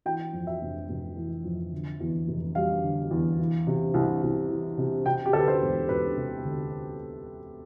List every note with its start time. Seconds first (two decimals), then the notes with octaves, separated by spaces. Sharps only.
0.05 E3 G5
0.33 F2
0.47 E5
0.61 F1
0.89 F1
1.16 E3
1.44 F2
1.72 D3
2.00 E2
2.27 F1
2.55 G3 F5
2.84 D3
3.11 E2
3.39 E3
3.67 C3
3.94 C2
4.23 C2
4.50 E3
4.78 C3
5.06 C3 G5
5.26 G4
5.33 D2 A4
5.40 B4
5.48 C5
5.62 E1
5.89 E1 B4
6.17 C3
6.45 D2